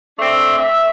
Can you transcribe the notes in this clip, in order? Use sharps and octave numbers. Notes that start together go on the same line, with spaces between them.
A3 C4 D4 E5
E5